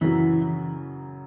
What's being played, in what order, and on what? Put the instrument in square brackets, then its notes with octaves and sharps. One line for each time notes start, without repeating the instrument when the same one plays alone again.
[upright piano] F#2 C#3 F#3 [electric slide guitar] E3